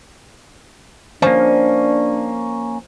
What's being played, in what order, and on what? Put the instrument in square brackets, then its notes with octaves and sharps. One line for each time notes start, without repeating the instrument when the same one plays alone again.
[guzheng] F3 [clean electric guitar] A#3 C#4 [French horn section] D4